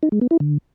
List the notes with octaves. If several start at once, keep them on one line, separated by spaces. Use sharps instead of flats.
D#4
G#3
B3
E4
D3